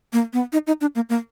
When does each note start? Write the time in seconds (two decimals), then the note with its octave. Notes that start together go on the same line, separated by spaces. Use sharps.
0.13 A#3
0.33 B3
0.53 D#4
0.67 D#4
0.81 D4
0.95 A#3
1.09 A#3